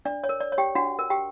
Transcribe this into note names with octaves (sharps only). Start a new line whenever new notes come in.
D4 D5
C#5
A#4
D5
C#5
G4 G5
D4 F#4 F#5
A#4
G4 G5